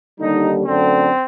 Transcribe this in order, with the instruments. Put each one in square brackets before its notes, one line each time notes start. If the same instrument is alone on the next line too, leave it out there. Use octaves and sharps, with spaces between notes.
[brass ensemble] D#2 D3 G3 D#4
F#2 D3 A3 C4